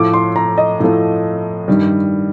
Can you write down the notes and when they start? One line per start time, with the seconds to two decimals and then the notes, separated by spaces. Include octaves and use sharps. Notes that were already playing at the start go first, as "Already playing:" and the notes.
Already playing: A2 F3 A3 D6
0.14 C6
0.36 A#5
0.58 D#5
0.80 A2 F3 A3
1.68 G2 D#3 G3